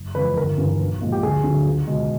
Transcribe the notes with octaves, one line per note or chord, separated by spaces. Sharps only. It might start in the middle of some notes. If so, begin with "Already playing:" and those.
Already playing: F#1
E2 C#3 F3 G#3 B4
G1 A#4
G2 E3
B1
A#2 F3 G#3
G4
D2 G#4
D3 F#3
C#2
B2 G#3